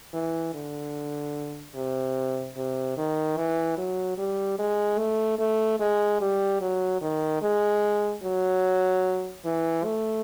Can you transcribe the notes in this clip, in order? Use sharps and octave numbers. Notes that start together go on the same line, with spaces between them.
E3
D3
C3
C3
D#3
E3
F#3
G3
G#3
A3
A3
G#3
G3
F#3
D#3
G#3
F#3
E3
A3